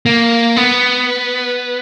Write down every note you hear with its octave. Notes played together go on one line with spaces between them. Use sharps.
A#3
B3